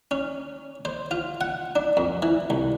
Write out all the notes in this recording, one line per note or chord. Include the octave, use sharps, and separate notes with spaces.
C#4
C5
F4
F#5
D4
F2
E3
C2